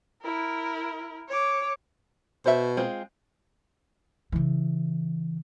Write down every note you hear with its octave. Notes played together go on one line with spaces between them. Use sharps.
E4 A#4
C#5 D6
B2 C5 E5
G#3 C4 F4
C#3 E3